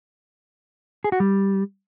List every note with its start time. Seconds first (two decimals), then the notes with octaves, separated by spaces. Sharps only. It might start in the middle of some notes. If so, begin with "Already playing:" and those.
1.04 G#4
1.12 F#4
1.20 G3